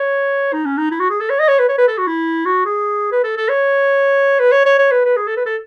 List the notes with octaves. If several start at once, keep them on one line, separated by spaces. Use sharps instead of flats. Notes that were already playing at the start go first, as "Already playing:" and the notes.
Already playing: C#5
D#4
C#4
D#4
E4
F#4
G#4
A4
C#5
D#5
C#5
B4
C#5
B4
A4
F#4
E4
F#4
G#4
B4
A4
A4
C#5
B4
C#5
C#5
C#5
B4
B4
G#4
A4
B4
A4